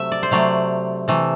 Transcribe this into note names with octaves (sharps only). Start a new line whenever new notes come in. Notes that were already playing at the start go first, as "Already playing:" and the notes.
Already playing: C3 F#3 A3 E5
D5
C5
C3 F#3 A3 D5
C3 E3 A3